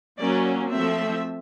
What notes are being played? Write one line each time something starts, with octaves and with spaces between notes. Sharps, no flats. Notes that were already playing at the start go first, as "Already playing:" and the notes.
F#3 A#3 C#4 D5
F3 A3 C4 E5